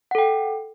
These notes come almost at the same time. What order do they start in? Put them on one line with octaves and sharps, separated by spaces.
F#5 A4 G5